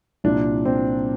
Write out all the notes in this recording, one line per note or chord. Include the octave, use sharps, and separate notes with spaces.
C2 A#2 F3 D4
C4